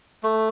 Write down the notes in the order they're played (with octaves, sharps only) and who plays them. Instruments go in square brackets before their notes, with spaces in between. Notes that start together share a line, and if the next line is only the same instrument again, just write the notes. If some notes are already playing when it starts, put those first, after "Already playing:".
[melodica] A3